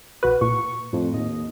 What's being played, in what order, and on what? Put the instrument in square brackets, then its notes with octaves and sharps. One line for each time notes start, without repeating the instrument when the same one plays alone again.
[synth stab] B1 F#4 B4
[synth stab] A#2 [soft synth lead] C#6
[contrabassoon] F2 [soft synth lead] A2
[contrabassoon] D#2 [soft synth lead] D#5